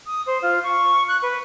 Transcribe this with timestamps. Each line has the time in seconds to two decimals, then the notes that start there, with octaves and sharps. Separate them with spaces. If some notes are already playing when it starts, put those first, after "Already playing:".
0.06 D#6
0.26 C5
0.42 F4
0.63 C#6
1.08 F#6
1.22 B4